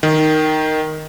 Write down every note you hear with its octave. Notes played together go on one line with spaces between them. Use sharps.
D#3